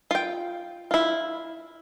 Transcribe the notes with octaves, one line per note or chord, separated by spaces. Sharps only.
F4 G5
E4 F4